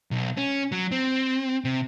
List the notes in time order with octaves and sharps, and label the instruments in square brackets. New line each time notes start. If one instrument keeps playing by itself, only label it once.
[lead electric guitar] B1
C#4
F#3
C4
C3